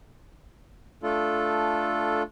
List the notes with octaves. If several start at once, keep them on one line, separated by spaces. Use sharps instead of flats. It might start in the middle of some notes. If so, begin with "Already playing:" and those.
A3 D4 F4 A4